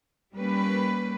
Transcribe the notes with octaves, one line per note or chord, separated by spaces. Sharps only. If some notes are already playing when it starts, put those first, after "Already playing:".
G3 A#3 C#4 B4